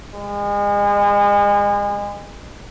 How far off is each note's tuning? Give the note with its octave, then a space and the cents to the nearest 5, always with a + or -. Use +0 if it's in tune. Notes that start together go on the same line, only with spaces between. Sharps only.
G#3 -35